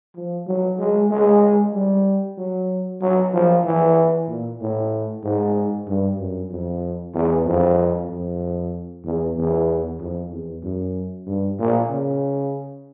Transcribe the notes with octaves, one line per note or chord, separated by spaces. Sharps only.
F3
F#3
G#3
G#3
G3
F#3
F#3
F3
E3
A#2
A2
G#2
G2
F#2
F2
E2
F2
F2
E2
E2
F2
E2
F#2
G2
A#2
C#3